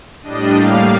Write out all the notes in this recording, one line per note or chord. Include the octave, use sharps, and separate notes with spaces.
A2 G3 D4 D#5
A2 G3 A#3 F5